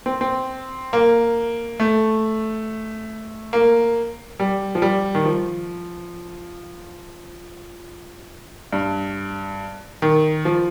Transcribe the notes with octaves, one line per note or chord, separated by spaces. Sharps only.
C4
C4
A#3
A3
A#3
G3
F3
G3
D#3
F3
G2
D#3
F3